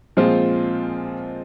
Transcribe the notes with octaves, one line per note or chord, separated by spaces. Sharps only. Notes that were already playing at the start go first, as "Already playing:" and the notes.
A#2 F3 G#3 C4 F4